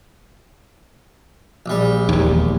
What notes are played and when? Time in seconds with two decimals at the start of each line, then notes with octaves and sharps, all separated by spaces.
1.66 A#1 G3
2.09 E1 D#2